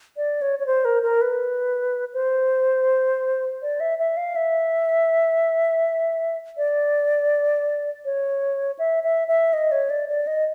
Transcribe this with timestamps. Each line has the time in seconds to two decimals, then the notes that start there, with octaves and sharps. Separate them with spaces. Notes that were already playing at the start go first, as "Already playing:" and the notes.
0.17 D5
0.42 C#5
0.59 C#5
0.66 C5
0.85 A#4
1.03 A#4
1.22 B4
2.13 C5
3.62 D5
3.80 E5
3.99 E5
4.17 F5
4.36 E5
6.57 D5
8.05 C#5
8.79 E5
9.04 E5
9.28 E5
9.53 D#5
9.72 C#5
9.90 D5
10.08 D5
10.27 D#5